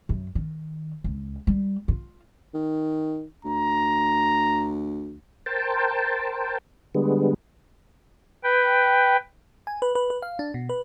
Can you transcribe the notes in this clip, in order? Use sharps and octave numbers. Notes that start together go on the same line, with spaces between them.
F#2
D#3
C#2
G3
F4
D#3
D2 A#5
A#4 C5 G5 A5
D3 G3 G#3 B3
B4 G5
G#5
B4
B4
B4
F5
D4
B2
B4